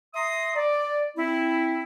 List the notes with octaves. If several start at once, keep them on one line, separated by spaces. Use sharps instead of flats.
E5 A#5 C6 D#6
D5
C4 E4